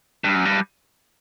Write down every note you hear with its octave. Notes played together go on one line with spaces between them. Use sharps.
G2
F#2
G2